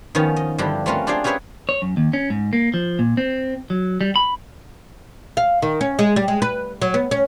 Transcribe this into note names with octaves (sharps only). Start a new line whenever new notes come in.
D#3 F3 B3 C#4
D#5
G2 D3 F3 G3 E4 G4
A3 C4 C#4 F4 A#4 B4
D4 F4 G4 G#4 D5 F5
C#4 G4 G#4 B4 C#5 E5
C#5
F#2
D#2
C#4
G#2
A#3
F3
A#2
C4
F#3
G3
B5
F5
D#3
C#4
G#3
G3
G#3
B4
F#3
B3
C#4